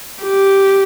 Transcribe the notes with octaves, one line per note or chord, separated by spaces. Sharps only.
G4